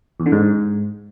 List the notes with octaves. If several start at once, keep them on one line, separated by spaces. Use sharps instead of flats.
E2
D3
G#2